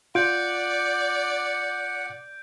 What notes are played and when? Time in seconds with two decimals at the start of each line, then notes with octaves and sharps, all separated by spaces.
0.15 F4 D5 F#5 G6 D7